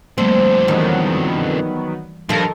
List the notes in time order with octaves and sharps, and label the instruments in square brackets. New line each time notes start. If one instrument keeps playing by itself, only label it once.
[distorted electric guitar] F2 D3 [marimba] G3 A3 A#3 [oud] C4
[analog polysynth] D#3 F#3 B3 [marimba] E3 [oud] G3
[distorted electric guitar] G2 [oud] D#3 A4 [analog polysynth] F3 A#4